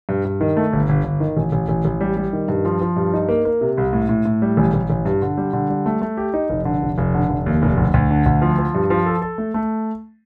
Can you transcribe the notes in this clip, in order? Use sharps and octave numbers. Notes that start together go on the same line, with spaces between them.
G2
G2
D#3
A3
G1
G1
G1
D#3
A1
A1
A1
A1
G3
G3
D#3
G2
F3
F3
G2
D#4
A#3
A#3
C3
C2
A2
A2
A2
G3
A1
A1
A1
G2
D3
G3
D3
G3
A3
A3
G4
D#4
F1
D3
F1
F1
D3
F1
D#2
F1
D2
D2
D3
D2
F3
F3
G2
F3
A4
A4
A3
A3